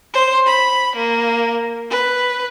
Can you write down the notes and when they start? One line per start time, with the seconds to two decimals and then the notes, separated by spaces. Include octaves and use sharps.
0.14 C5
0.46 B5
0.96 A#3
1.90 B4